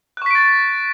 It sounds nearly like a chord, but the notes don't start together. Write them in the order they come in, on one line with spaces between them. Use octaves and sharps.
F#6 C#6 B6 D7 A6